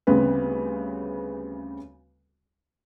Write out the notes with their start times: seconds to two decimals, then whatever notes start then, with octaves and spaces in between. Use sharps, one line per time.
0.07 D2 C#3 G3 B3 C4 B4